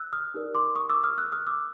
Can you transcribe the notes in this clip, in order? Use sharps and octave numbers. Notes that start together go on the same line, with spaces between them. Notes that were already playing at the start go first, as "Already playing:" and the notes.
Already playing: E6 F#6
D#6 F6
D#4 G4 A#4 D5
C6 D6
C#6 D#6
D6 E6
D#6 F6
E6 F#6
D#6 F6
D6 E6